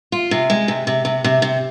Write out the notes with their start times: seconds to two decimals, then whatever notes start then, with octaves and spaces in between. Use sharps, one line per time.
0.12 F4
0.31 C3
0.50 G#3
0.68 C3
0.87 C3
1.05 C3
1.24 C3
1.42 C3